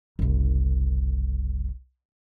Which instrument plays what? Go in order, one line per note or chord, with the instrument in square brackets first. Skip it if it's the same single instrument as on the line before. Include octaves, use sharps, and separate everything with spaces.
[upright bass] F#1 C2